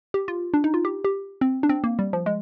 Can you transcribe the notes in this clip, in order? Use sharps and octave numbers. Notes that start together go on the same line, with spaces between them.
G4
F4
D4
D#4
F4
G4
G4
C4
D4
C4
A#3
G3
F3
G#3